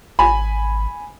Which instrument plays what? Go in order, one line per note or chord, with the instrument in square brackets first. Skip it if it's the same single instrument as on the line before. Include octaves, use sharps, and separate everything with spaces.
[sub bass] G#1 [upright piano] G#5 B5